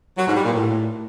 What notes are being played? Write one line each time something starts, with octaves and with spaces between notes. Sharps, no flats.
F#3
G#2
G3
A#2
A2